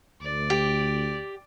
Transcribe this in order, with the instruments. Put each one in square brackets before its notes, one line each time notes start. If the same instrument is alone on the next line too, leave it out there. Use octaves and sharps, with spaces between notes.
[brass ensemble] D2 [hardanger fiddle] D5
[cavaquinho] G4